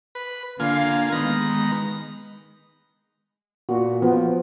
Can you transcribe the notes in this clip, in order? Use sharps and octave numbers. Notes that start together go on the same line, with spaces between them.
B4
D3 A#3 F4 F5 G#5
D#3 G#3 B3 A#5
A#2 F#4
F3 B3